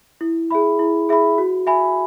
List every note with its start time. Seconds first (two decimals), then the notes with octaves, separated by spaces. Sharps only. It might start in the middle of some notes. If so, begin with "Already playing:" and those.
0.21 E4
0.51 G#4 E5 B5
0.79 E4
1.09 G#4 E5 B5
1.38 F#4
1.67 E5 G#5 B5